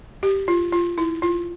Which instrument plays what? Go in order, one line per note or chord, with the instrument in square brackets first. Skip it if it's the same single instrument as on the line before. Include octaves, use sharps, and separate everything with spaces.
[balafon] G4
F4
F4
E4
F4